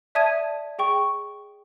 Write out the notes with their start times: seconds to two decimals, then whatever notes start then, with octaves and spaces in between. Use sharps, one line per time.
0.15 D5 E5 A5 D#6 G#6 D#7
0.79 G#4 G5 C#6